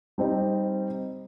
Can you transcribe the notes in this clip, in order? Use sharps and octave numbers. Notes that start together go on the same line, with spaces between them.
G3 C4 D#4